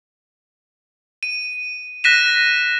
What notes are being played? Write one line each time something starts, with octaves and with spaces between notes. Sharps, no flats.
D#7
F#6 A#6 B6 D#7 E7